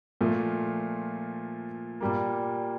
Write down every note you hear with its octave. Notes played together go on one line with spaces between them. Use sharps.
A#2 F3 A3
A#2 G3 A#3